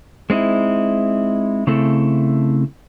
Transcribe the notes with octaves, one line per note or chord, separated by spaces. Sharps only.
G#3 C4 D#4 E4
C#3 A3 C4 E4 A4